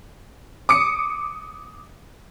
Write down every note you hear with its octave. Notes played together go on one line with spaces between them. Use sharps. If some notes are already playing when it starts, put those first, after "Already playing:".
D6 D#6 C#7